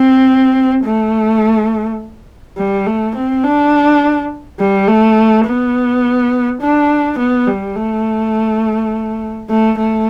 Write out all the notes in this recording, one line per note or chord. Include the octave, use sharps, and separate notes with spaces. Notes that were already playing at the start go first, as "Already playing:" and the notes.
Already playing: C4
A3
G3
A3
C4
D4
G3
A3
B3
D4
B3
G3
A3
A3
A3